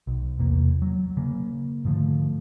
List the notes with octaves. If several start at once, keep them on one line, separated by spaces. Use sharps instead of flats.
B1
E2 C3 A#3
F#3
C#3 A#3
G#2 D3 F3 A3